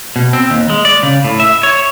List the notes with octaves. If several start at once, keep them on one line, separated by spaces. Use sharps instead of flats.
B2
C4
D#2
G#3
D5
C#3
A2
E5
C#5